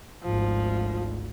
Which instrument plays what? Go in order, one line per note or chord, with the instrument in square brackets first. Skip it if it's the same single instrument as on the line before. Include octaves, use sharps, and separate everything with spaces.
[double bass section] G#1 D2 G#2 [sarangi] F3